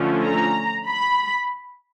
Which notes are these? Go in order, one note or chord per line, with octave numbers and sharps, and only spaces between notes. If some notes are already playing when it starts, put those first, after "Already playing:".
Already playing: D3 F3 A3 C#4
A#5
B5